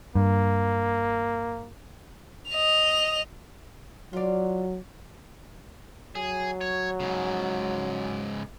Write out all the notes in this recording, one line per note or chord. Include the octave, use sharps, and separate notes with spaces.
G2 A#3
D#5 F7
F#3 F4 D5
F#3 G#4
C#5
G#2 C#3